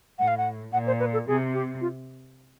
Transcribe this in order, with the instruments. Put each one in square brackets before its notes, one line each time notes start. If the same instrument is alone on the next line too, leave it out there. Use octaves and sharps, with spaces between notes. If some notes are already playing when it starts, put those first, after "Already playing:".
[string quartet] A2 [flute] F#5
[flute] F5
F#5
[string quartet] A#2 [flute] F#5
[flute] C5
B4
A4
[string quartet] C3 [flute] G#4
[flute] G4
F4